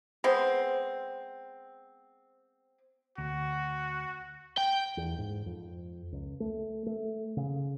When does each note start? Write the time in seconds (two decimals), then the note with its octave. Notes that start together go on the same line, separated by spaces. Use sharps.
0.24 G#3 B3 C4
3.18 D2 F#4
4.58 G5
4.97 E2
5.18 G#2
5.46 F2
6.12 C#2
6.40 A3
6.86 A3
7.37 C#3